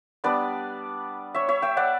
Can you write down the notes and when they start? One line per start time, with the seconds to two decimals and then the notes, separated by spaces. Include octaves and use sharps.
0.24 G3 B3 D4 B4 D5
1.34 C#5 E5
1.48 C#5 E5
1.62 E5 G5
1.77 D5 F#5